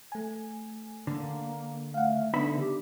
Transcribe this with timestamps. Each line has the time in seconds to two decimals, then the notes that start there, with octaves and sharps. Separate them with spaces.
0.12 A3 G#5
1.07 D3 A#3
1.94 A3 F5 F#5
2.34 D3 B3 D4 D#4 E5 B5
2.60 G4